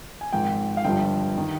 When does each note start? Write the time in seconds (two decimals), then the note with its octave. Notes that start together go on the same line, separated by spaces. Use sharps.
0.21 G#5
0.33 G#1 G#2 F3 G5
0.77 F5
0.84 G1 G2 F3 G5
1.38 D#3